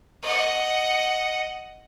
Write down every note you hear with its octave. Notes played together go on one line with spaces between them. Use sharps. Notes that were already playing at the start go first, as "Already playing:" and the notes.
D#5 F#5